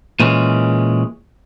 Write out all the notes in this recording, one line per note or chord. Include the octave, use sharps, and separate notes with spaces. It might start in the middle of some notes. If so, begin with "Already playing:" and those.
A#2 E3 G#3 C#4